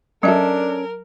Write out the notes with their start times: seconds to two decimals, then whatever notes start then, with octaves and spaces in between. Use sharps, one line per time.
0.23 F#3 C#4 D4 A4 A#4 E5